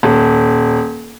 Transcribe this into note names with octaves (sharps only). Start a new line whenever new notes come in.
D#1